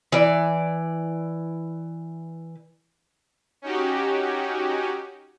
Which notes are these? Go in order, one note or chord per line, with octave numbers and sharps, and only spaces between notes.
E3 D5
C#4 D#4 F#4 G4